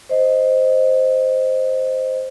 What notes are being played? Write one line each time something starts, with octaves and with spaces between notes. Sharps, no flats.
C5 D#5